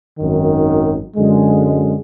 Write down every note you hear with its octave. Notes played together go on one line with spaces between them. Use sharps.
G#1 F#2 D#3
F#2 D3 G#3